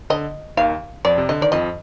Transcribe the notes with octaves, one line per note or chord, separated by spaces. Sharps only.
D3 D#5
D#2 D#3 F5
F2 F3 D5
C3
D3 D#5
D#3 D5
F2 F3 D#5